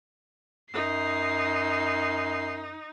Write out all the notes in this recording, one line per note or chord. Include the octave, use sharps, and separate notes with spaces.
F#2 D#4 C7